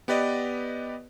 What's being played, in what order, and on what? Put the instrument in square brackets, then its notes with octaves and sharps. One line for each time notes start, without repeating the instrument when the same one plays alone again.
[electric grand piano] B3 G4 B4 D5 D#5